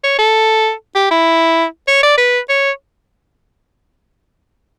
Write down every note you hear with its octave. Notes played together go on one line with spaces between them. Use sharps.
C#5
A4
G4
E4
C#5
D5
B4
C#5